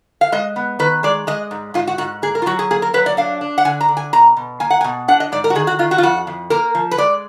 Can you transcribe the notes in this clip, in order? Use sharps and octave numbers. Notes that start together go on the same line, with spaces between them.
F5
G#3 D#5
B3
D#3 B4
G#3 D5
G#3 D#5
G#2
G#2 F4
F#4
G#2 F#4
A#3 G#4
A#4
F4
F#3 F#4
G#4
A#3 G#4
A#4
F#3 B4
D5
D4 F5
D4
F#5
D3 G#5
A#5
D3
G#5
B2 A#5
B2
A#3 G#5
F#5
G#5
B2
D4 F#5
D#5
G#2 D5
A#4
F#4
D#3 G#4
F#4
D#3 F4
F#4
F4
F2 F#4
F2
A#3 A#4
F3
B4
G#3 D5